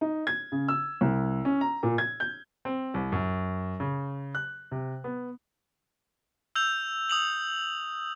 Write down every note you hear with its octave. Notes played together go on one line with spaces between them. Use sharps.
D#4
G#6
C#3
E6
C2
C#4
A#5
A#2
G#6
G6
C4
C2
F#2
C#3
F#6
C3
B3
E6 G6 F7
D#6 F7 F#7